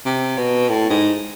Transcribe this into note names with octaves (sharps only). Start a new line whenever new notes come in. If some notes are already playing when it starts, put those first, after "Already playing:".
C3
B2
A2
G#2